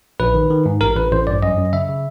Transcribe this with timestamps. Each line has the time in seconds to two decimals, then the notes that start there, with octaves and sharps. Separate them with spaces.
0.20 A#1 B4
0.34 D#3
0.50 D#3
0.66 G#2
0.81 A1 A#4
0.96 A1 B4
1.12 A1 C5
1.27 G2 D5
1.43 F#2 D#5
1.58 F#2
1.73 C#3 E5
1.89 C#3